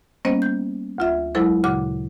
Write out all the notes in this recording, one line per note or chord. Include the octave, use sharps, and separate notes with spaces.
G3 A#3 B3 C#4 C5 D#5
G6
D2 F4 E5
F#3 G#3 E4 A4 C5
D2 A#2 C#3 F#4 D6